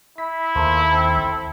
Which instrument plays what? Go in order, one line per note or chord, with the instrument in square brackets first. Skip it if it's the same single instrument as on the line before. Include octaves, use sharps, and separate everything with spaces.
[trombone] E4 [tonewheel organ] B5
[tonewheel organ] D#2 [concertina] A3 A#3 C5
[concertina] C4 A4